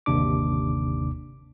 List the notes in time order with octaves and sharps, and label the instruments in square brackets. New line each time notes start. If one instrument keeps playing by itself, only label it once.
[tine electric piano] G1 D#2 C3 D4 D6